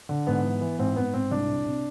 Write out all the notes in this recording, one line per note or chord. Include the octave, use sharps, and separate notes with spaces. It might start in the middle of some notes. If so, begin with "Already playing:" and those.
D3
G#2 B3
E3
E3
G#2 C4
G#2 B3
G#2 C4
C2 D4
C3
C3